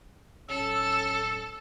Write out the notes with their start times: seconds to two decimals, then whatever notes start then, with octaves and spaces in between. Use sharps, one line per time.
0.49 D1 C#4 A4 E6